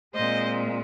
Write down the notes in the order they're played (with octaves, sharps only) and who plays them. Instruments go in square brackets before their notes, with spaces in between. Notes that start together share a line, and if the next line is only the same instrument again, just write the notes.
[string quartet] A#2 G#3 C4 C5 D#5